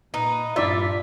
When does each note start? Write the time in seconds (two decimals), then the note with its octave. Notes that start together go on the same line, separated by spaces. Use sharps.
0.14 A#2 D#4 B4
0.56 G2 E4 F4 D5 E5